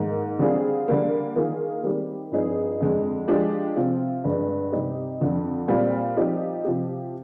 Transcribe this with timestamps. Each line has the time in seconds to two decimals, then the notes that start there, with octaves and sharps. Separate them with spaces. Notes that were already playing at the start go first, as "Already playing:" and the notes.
Already playing: G#2 D#3 A#3 D#4
0.39 D3 G3 C4 F4 G#4
0.88 D3 G3 A#3
1.35 D#3 A#3 F4 G#4
1.83 D#3 G3 C4 G4
2.32 G2 F3 C4 D#4 G#4
2.80 F2 D3 G#3
3.28 F3 G#3 D4 G4
3.76 C3 F3 C4 F4
4.24 G2 D3 G#3
4.72 C3 G3 C4 D#4 G4
5.20 F2 D3 F3
5.68 A#2 G3 C4 F4
6.17 F3 C4 D#4 G4
6.64 C3 F3 C4 G4